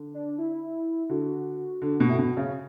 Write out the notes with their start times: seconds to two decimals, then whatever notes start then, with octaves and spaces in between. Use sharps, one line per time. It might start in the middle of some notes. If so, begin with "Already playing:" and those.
Already playing: D3
0.14 D4
0.38 E4
1.09 D3 F#4
1.82 D3
2.00 B2
2.09 A2
2.19 B2
2.37 C#3